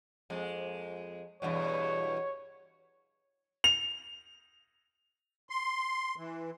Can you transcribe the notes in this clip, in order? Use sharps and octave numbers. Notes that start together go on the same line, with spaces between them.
F2 G#3
E2 G2 B2 C#5
F7
C6
E3